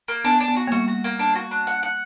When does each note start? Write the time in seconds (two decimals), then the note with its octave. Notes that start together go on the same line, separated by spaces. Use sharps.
0.08 A#3
0.24 B3 D4
0.40 D4
0.48 B3
0.56 F#4
0.67 A#3
0.72 G3 F#4
0.88 F#4
1.04 A#3
1.19 D4
1.35 F#4
1.51 D4
1.67 F#5
1.83 F#5